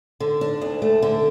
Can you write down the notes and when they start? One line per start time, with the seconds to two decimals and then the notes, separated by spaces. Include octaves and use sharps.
0.20 D3
0.41 D4
0.61 D2
0.82 A3
1.02 D3